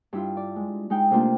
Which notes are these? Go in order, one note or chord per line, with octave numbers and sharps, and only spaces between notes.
G2 E4 F4
D5
G#3
G#3 D#4 G5
C3 A3 A#3 D4 F4 G4